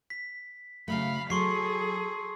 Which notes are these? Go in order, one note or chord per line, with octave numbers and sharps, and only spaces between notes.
B6
C#3 F#3 A3 F5 B5
F#3 G#4 A4 C6 C#6 C7